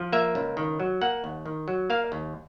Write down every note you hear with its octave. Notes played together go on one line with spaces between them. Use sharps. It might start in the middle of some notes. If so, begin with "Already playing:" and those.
Already playing: F3
A#3 E5
C#2
D#3
F#3
A#3 F#5
D#2
D#3
F#3
A#3 F5
D#2